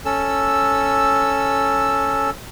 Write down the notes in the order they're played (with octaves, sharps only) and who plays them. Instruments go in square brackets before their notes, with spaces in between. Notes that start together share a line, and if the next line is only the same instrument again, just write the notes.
[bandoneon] C#4 A4 E6